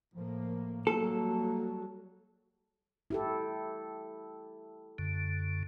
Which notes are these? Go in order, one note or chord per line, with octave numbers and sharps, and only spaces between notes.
A2 F3 A#3
F#3 G3 A#3 A4
E4 G4 A4
F#2 D3